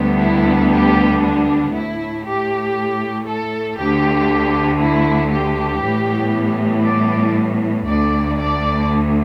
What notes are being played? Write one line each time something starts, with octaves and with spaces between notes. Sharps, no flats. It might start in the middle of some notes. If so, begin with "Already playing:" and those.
Already playing: D2 D3 G3 B3
E4
G4
D4
A2 A3 E4
G4
A4
D2 D3 A3 G4
E4
G4
A2 E3 G3 B3
D5
D2 D3 A3 D5
D5